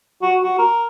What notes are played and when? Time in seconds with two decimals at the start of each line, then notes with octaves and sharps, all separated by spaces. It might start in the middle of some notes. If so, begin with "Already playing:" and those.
0.22 F#4
0.43 F#4
0.58 A#4